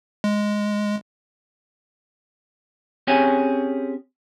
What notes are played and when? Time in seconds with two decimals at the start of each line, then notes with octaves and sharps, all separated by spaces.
0.24 G#3
3.07 C4 C#4 G4 G#4 C#5 G#5